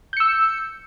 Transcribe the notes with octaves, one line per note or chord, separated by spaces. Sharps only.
E6 G6 C#7